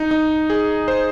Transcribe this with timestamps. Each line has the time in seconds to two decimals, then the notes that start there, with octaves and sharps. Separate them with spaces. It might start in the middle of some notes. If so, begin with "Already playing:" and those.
Already playing: D#4
0.11 D#4
0.50 G#4
0.88 C5